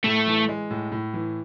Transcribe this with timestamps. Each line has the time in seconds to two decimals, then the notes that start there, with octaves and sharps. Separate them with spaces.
0.04 A2 A3
0.27 E3
0.49 G#3
0.70 A2
0.92 A2
1.14 E3